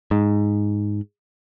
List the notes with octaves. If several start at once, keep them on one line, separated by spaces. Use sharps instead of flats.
G#2